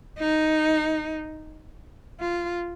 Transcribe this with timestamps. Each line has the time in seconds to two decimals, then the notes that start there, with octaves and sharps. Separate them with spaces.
0.19 D#4
2.20 F4